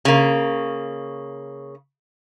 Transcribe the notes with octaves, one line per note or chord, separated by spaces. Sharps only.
C#3 A#3